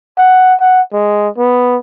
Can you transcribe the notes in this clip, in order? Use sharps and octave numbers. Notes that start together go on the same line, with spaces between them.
F#5
F#5
G#3
B3